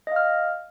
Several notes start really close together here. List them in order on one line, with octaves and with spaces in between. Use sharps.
D#5 F5 F6